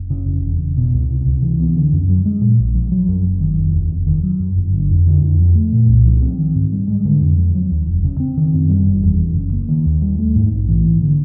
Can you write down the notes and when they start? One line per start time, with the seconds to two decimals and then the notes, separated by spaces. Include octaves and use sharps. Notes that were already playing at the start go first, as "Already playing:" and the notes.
Already playing: F#1
0.10 C#3
0.26 F1
0.43 E2
0.60 F1
0.77 B2
0.94 C#2
1.10 C3
1.26 C#2
1.42 E3
1.60 B3
1.76 D3
1.92 F#2
2.09 F#3
2.25 G#3
2.41 A#2
2.59 A#1
2.75 F3
2.92 F#3
3.08 F#2
3.25 F#1
3.40 D#3
3.58 F1
3.73 D#2
3.91 F1
4.07 D#3
4.23 F#3
4.40 F#2
4.56 G1
4.73 D3
4.90 F2
5.07 D3
5.22 F2
5.40 F3
5.55 A3
5.73 A#2
5.88 C2
6.06 F3
6.21 C4
6.38 D#3
6.55 G#2
6.72 G3
6.87 G#3
7.05 D3
7.21 F2
7.38 F3
7.54 F#3
7.71 D#2
7.87 F1
8.04 C#3
8.20 C4
8.37 D#3
8.54 F#2
8.70 G3
8.87 F#1
9.03 E2
9.20 F#1
9.36 C#3
9.53 A#3
9.69 D#3
9.86 D#2
10.02 G3
10.19 A3
10.36 G#2
10.52 A#1
10.69 E3
10.85 A#3
11.02 D3